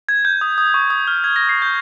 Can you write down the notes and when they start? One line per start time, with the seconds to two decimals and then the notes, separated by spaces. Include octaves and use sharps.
0.09 G#6
0.25 G6
0.41 D#6
0.58 D#6
0.74 C#6
0.90 D#6
1.07 F6
1.24 G#6
1.36 A#6
1.49 C7
1.62 G6